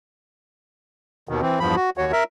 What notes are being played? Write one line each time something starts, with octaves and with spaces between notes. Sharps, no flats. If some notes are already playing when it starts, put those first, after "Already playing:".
D#2 B2 D#3
E3 C4
E2 G2 F3 B5
F#4
D#2 F#4 C#5
A#4 E5